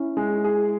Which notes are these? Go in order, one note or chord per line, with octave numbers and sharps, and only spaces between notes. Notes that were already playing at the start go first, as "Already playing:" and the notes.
Already playing: C#4 E4
G#3
G#4